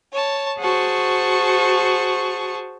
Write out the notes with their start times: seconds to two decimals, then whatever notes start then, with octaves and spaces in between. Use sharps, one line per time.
0.13 C#5 A5
0.59 F#4 G#4 C5 A5 C#6